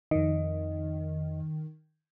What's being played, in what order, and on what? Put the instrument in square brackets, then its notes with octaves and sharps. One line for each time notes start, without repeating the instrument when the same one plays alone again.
[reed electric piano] F2 D#5 [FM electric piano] D#3